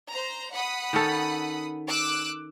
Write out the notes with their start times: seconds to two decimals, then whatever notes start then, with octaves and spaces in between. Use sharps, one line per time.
0.12 C5 A#5
0.52 F#5 B5 D#6
0.93 D#3 C#4 A4
1.87 D6 E6 F#6